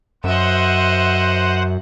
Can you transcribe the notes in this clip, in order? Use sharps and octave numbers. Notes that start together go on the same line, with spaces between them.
F#2 C5 D#5 E5 F#5